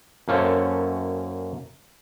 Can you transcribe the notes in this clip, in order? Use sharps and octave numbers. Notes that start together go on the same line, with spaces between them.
F#2 A#3 C#4 A4 C5 C#5